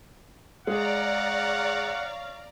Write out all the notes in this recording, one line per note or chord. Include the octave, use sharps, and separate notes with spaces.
G#3 G#4 C#5 D5 F5 F#5 A#5